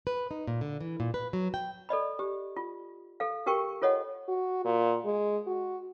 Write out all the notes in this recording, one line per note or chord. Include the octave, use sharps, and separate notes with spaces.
B4
D#4
A#2
D3
E3
A#2
B4
F#3
G5
A4 D5 D#5 B5
G4
F4
A4 F5
F#4 G4 A#4 G5 C#6
F4 A4 C#5 D#5 F#5
F#4
A#2
G#3
F#4